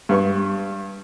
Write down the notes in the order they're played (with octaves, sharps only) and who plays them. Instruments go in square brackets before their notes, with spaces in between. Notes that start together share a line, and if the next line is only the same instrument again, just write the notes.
[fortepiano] G2 B3 C#6